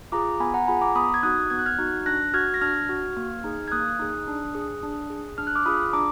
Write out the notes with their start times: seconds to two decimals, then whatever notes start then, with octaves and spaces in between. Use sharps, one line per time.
0.12 F4 G#4 A#5 D6
0.40 B3 G#5 B5
0.54 F#5 A#5
0.67 F4 G#4 G#5 B5
0.81 A#5 D6
0.95 B3 B5 D#6
1.14 G#6
1.23 D#4 F#4 D#6 F#6
1.50 B3 G#6
1.59 F#6
1.66 F6 G#6
1.78 D#4 F#4
2.06 D4 F#6 A#6
2.34 F#4 F6 G#6
2.54 A#6
2.61 D4 F6 G#6
2.89 F#4
3.17 A#3
3.44 D#4 G#4
3.68 G#6
3.72 A#3 D#6 F#6
3.99 D#4 G#4
4.28 D4
4.55 G#4
4.83 D4
5.10 G#4
5.38 D4 F6
5.47 F#6
5.55 D6 F6
5.66 F4 G#4 B5 D#6
5.93 D4 A#5 D6